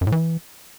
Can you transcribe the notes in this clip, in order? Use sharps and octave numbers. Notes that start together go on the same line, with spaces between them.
F#2
A2
E3